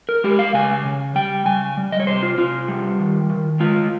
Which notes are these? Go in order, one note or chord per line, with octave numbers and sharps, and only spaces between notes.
A#4
G#3 G4
F5
C#3 G#5
C#3
G3 G5
C#3 G#5
G3
D#5
C#5
C3 C5
F4
C3 F4
G3
D#3
D#3
G#3 F4